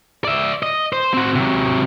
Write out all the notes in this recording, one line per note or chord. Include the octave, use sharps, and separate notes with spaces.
D5 E5
D#5
C5
C4 F#4
C3 F#3